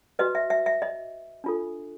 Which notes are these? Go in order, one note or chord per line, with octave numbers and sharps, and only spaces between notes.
F#4 B4 D#5
E5
E5
E5
D#5
D4 F4 A4